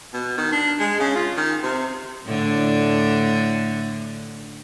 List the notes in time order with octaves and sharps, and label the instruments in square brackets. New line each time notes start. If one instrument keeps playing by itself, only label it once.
[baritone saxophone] B2
D#3
D4
G#3
C#3
F4
D#3
C3
[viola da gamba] A2 D3 D4